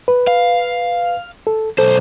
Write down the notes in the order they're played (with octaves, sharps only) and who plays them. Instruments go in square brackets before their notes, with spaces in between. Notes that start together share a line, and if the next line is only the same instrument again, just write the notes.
[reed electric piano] B4
[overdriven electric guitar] F5
[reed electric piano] A4
[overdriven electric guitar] B1 C5 [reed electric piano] A4